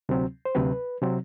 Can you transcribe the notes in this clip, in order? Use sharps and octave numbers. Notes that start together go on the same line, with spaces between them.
D2 C3 F#3 C4
C5
D2 C3 F#3 C4 B4
C3 F#3 C4